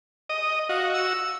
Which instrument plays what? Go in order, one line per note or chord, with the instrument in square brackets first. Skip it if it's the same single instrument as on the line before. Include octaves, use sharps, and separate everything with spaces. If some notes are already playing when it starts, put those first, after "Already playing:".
[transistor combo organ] D#5
[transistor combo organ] F#4 [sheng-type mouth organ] D#5 F5
[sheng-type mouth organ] E6